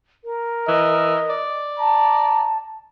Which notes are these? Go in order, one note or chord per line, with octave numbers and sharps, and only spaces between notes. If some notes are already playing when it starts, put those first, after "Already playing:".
A#4
E3 D#5
D5
A5 A#5